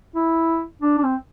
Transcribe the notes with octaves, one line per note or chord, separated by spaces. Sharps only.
E4
D4
D4
C4